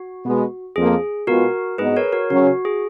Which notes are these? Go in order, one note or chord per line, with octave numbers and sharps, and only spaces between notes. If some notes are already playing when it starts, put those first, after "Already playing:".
Already playing: F#4
B2 G#3 B3
F2 F3 A#3 G#4
B2 G#3 B3 F4 F#4 A#4
G#2 F#3 B3 D#4 G#4 B4
A#4 C#5
F#4 A#4
C#3 F#3 C#4 F#4
F#4
G#4